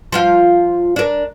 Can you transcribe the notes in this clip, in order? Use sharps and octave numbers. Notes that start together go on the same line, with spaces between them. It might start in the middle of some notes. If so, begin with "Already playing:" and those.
F3 F4 F5
D4 A#4